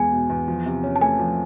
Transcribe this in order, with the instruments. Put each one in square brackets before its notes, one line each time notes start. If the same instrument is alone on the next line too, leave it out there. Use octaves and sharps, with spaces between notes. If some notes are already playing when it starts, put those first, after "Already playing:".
Already playing: [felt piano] E2 G#3 B3 [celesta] G#5
[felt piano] B2
E2
F3
C3
C#4
[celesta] A5
[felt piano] A3 [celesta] G#5
[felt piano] F3